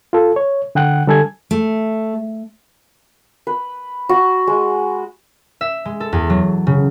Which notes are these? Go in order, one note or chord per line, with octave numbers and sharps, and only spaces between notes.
F4 A4
C#5
D3 F#5 G5 F#6
D3 G3 A4 G#5 G#6
A3
B4
F#4
G#3
E5
G#3
A4
E2
F#3
C#3